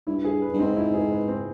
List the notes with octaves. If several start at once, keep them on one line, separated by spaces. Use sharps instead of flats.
G2 E4
G#4
B4
G2
G#2 C4
E4
G#4
B4
C4